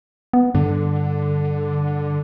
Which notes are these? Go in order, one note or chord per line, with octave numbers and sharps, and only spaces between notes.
B3
G2 D3